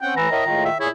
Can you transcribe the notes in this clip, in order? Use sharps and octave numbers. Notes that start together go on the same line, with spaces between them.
C4 C#4 F#5 G5
A2 E3 A#5
A2 A#4 D#5 E5
A2 D#3 G#3 F4
E5
A#2 E4 G#4 C#5